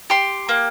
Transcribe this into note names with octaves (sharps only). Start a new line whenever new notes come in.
G4 C6
A#3